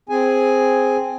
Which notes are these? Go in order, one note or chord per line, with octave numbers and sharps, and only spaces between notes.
C4 G#4 G#5